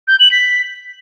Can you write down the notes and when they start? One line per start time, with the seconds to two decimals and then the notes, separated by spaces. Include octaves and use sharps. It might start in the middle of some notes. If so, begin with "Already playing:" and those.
0.08 G6
0.19 F#7
0.31 B6